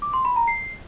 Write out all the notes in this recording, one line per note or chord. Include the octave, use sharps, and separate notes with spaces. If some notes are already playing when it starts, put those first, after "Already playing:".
D6
C6
B5
A#5
C7